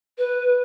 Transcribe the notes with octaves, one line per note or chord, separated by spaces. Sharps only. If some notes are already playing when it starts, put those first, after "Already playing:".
B4